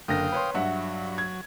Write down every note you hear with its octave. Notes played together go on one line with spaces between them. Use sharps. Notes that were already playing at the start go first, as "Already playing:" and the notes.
F#1 D3 F5 G5 D#6 A#6
B4 C#5 C6
G2 F#3 E5 F#5
G#6